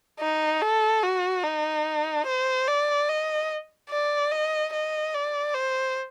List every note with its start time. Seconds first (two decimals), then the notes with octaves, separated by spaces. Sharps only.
0.20 D#4
0.62 A4
1.03 F#4
1.44 D#4
2.27 C5
2.67 D5
3.09 D#5
3.90 D5
4.31 D#5
4.73 D#5
5.14 D5
5.54 C5